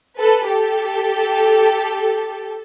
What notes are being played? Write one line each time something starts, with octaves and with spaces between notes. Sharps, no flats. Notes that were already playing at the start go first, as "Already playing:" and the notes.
A4 B4
G4 A4